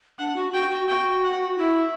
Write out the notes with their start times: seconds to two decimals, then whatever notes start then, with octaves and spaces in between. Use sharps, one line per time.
0.19 D4 F#5
0.36 F#4
0.53 F#4 G5
0.71 F#4
0.88 F#4 G5
1.24 F#5
1.58 E4 E5